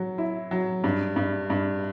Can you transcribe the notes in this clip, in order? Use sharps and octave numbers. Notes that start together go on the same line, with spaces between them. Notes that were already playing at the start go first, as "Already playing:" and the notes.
Already playing: F#3
E4
F#3
G2
G2
G2